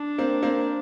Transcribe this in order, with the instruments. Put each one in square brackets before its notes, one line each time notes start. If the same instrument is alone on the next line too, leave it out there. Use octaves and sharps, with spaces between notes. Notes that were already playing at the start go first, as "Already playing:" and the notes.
Already playing: [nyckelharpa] D4
[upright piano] A#3 C4
A#3 C4